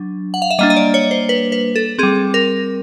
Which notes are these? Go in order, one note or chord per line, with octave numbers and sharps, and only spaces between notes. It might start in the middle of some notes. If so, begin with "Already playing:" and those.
Already playing: F#3 D4
F#5
F5
E5
G3 A#3 D4 D#5
D#5
D5
C#5
C5
B4
B4
A4
G3 C4 G#4
A#4